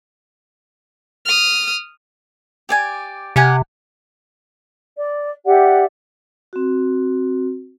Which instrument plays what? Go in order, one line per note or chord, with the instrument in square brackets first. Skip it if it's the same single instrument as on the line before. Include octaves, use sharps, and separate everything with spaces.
[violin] D#6 F6
[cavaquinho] G4 D5 G#5
[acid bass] C3 [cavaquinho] G4 F#5 G#5
[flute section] D5
G4 D5 E5 F#5
[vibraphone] C4 F#4